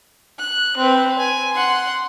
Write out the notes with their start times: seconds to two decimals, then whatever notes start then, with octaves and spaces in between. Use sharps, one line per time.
0.39 F#6
0.77 C4 B4
1.18 G#5
1.53 F#5 C6